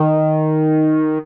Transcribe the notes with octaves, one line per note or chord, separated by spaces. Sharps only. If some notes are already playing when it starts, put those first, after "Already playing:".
Already playing: D#3